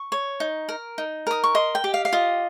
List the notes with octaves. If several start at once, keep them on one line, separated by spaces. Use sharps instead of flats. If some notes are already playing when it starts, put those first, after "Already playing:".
Already playing: C#6
C#5
D#4
A#4
D#4
A#4 D#6
C#6
D#5 C6
G5
G4
F5
F5
F4 D#5